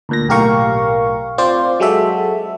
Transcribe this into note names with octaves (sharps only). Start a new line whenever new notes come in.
D2 A#2 A#6
B1 A2 G4 A#4 F5 C#6
C4 F4 C5 D5
F#3 G#3 F#4 A4 E5